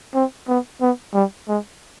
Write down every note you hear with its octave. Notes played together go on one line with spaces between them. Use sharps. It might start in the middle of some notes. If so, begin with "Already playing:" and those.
C4
B3
B3
G3
G#3